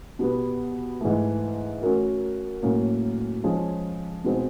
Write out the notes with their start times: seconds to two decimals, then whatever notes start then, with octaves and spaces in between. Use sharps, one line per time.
0.19 B2 G3 B3
1.01 G#2 E3 A3
1.82 A3 C#4 F#4 A#4
2.62 A2 F#3 A#3 C#4 F#4
3.43 F3 G#3 C#4 F4 G#4
4.24 B2 G#3 C4